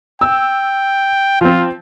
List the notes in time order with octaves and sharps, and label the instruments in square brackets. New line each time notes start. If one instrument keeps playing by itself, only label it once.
[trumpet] G5 [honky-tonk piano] E6
[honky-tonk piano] F3 C4 [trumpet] F4